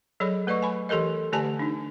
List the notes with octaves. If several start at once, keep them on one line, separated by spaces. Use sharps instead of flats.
F#3 G#4 A4 C#5 D5 B5
A3 B4 D5 D#5 C#6
G#5 B5
E3 G4 A4 A#4 D#5
D3 A3 G4 D5 G#5 A5
D4 D#4